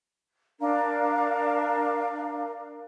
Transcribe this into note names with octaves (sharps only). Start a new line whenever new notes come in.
D4 A#4 F5 A#5